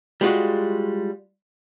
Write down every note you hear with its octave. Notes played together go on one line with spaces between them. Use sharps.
G3 G#3 F4 F#4